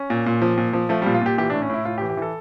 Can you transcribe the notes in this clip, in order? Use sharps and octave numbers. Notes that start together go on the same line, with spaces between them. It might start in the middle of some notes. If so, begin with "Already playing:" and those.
Already playing: C#4
A#2
A#2
F3
A#2
F3
F3 A3
G3
A#2
F4
A#2 G4
E3 G4
D4
A2
C#4
A2 E4
A2 F4
G4
E3
G4
E3 A4